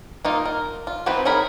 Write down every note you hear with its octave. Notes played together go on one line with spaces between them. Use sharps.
A#3 D#4 F4
A#4
F4
E3 B3 C4 D#4 B4
F#3 D#4 G#4 A#4 B5